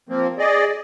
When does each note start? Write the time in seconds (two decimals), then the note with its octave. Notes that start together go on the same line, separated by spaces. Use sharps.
0.09 F3 A#3 C4
0.38 G#4 D5 D#5